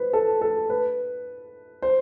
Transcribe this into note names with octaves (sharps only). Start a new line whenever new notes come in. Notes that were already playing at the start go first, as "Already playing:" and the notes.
Already playing: B4 C5
A4
A4
B4
C5